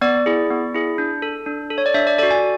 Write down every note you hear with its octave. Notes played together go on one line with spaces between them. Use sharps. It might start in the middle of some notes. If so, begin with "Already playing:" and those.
B3 D5
E4 G#4
B3
E4 G#4
D4
A4
D4
A4
C#5
D5
D4 E5
D5
F#4 A4 D5
G#5